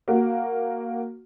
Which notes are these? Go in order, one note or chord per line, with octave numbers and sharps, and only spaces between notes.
A#3 F#4